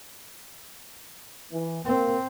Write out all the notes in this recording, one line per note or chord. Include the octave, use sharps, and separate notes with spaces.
E3
A#3 C4 A#4